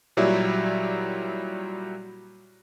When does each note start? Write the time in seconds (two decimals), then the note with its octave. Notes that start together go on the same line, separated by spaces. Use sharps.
0.17 A#2 F#3 G3 E4